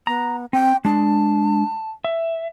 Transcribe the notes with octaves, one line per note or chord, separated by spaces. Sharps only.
B3 A#5
C4 G5
G#3 D4 A5
E5